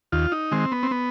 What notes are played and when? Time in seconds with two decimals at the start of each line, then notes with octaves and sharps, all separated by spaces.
0.12 D#2 F4
0.32 D#4
0.52 D#3 G#3 C4
0.72 B3
0.83 C4
0.91 B3